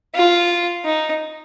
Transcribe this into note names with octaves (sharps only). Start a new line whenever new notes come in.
F4
D#4